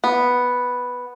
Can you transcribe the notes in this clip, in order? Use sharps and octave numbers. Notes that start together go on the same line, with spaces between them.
B3